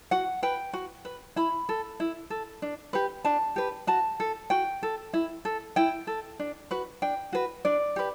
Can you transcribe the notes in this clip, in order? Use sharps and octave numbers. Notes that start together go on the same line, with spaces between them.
F#4 F#5
B4 G5
F#4
B4
E4 B5
A4
E4
A4
D4
G4 B4
D4 A5
G4 B4
F#4 A5
A4
F#4 G5
A4
E4
A4
E4 G5
A4
D4
F#4 B4
D4 G5
F#4 B4
D4 D5
G4 B4